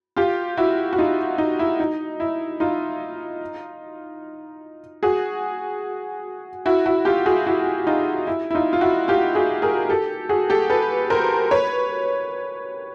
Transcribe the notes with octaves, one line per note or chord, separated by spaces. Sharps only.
F4 G4
E4 F#4
F#4
D#4 F4
D#4
E4
D#4
E4
D#4 F4
F#4 G#4
E4 F#4
E4 F#4
F4 G4
F#4 G#4
E4 F#4
D#4 F4
E4
E4
D#4 F4
F4
E4 F#4
F4 G4
F#4 G#4
G#4 A#4
G4 A4
F#4 G#4
G4 A4
A4 B4
A#4 C5
B4 C#5